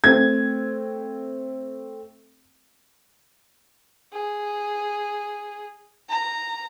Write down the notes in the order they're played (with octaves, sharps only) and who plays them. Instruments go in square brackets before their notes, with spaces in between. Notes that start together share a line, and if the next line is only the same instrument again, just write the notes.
[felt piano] A3 C4 [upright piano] G#6
[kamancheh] G#4
A#5